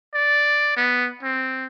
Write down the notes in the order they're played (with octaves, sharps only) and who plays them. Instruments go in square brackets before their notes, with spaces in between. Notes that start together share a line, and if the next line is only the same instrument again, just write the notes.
[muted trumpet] D5
B3
C4